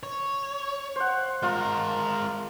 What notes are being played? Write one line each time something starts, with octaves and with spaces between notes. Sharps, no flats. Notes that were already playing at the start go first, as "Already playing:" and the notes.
C#5
C5 F#5
G#3 F4 A#4